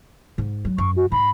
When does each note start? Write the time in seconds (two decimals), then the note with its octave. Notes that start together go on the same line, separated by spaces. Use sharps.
0.38 G#2
0.65 F#3
0.78 F#2 C#6
0.96 F#4
1.12 G#2 B5